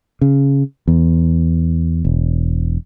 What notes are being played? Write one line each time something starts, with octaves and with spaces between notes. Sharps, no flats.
C#3
E2
E1